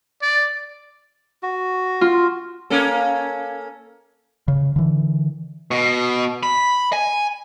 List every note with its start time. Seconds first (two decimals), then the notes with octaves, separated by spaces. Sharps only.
0.22 D5
1.43 F#4
2.01 F4
2.70 A#3 C#4 A4
4.48 C#3
4.76 D3 E3
5.71 B2
6.43 B5
6.93 G#5